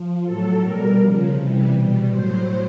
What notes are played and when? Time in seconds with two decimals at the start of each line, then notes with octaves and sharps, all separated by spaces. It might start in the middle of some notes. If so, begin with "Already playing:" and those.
Already playing: F3
0.24 A2 F#3 A4
0.61 B2 G3 A#4
0.98 C#3 F3
1.34 C3 E3 G3
1.72 B2 G3
2.08 A2 F#3 C5